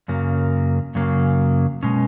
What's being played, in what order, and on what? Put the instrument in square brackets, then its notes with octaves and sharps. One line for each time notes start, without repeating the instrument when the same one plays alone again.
[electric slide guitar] F#2 C#3 F#3 A#3
F#2 C#3 F#3 A#3
B2 G#3 C#4